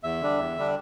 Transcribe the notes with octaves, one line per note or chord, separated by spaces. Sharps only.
E2 E5
D3 G3 D4
E2
D3 G3 D4